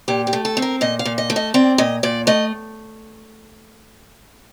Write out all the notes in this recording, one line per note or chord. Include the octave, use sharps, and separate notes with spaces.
A#2 G4
G4
A3
A4
C4
A#4
A#2 D#5
F5
A#2
D#5
A3
D#5
C4 D5
A#2 D#5
A#2 D5
A3 D#5